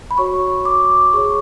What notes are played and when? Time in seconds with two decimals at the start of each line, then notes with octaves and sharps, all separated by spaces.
0.11 B5
0.18 F#4 C#5 C#6
0.65 D6
1.13 G#4 C#5 C#6